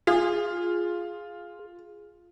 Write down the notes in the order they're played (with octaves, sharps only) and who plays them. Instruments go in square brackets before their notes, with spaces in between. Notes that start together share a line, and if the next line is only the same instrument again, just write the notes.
[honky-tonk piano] F4 [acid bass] G#4